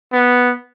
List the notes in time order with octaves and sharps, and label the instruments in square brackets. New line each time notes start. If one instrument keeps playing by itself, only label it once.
[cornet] B3